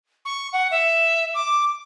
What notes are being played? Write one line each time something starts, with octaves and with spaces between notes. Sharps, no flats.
C#6
F#5
E5
D6